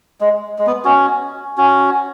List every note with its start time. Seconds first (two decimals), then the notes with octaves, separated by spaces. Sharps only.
0.21 G#3
0.59 G#3
0.67 B3
0.85 C#4 F#4
1.57 C#4 F#4